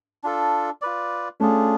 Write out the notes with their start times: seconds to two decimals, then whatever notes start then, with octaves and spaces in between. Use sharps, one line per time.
0.24 D4 F4 A4
0.82 F4 B4 D5
1.40 A3 C#4 D4 F4 G#4